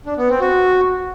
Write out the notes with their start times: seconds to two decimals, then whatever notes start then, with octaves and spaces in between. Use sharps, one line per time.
0.06 D4
0.17 B3
0.29 C4
0.40 F#4